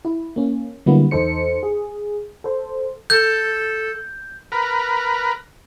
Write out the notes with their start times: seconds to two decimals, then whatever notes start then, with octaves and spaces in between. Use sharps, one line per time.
0.05 E4
0.36 A#3 C#4
0.86 D3 F#3 G3 A#3 B3 E4
1.11 E2 D#4 A4 C5 C#7
1.63 G#4
2.44 A4 C5
3.10 A4 G6
4.52 A#4 B4